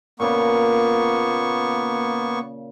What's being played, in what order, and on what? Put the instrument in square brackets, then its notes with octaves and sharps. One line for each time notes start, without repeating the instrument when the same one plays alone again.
[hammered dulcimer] A#2 C#3 [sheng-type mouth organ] A#3 B3 C#6